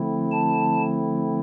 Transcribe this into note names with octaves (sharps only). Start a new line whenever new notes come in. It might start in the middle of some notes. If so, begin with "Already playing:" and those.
Already playing: D3 F3 A3 C4 E4
A5